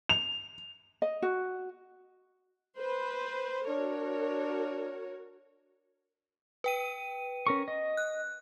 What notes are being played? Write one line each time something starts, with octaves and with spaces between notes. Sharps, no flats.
F7
D#5
F#4
B4 C5
D4 F#4 A#4 C#5
B4 G5 D#7
C#4 A#4 C#6
D#5
F#6